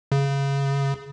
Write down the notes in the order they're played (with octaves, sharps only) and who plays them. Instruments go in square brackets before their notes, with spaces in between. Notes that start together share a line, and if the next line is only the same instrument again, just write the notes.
[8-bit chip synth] C#3